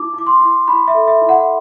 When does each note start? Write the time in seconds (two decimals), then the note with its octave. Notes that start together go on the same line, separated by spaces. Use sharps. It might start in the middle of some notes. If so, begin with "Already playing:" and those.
Already playing: E4 D6
0.13 E4
0.18 D6
0.27 C6
0.40 E4
0.68 E4 B5
0.88 E5
0.94 A4
1.08 E5
1.21 E4
1.29 F#5